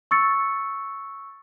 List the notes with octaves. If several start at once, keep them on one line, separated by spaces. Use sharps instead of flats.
C#6 E6 A6 C#7